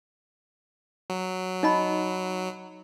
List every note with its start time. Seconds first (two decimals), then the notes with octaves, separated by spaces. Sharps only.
1.10 F#3
1.63 D#4 D#5 B5